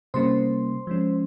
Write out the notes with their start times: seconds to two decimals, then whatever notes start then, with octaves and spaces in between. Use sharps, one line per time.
0.14 C3 G3 A#3 C#4 C5 C6
0.87 F3 G#3 C#4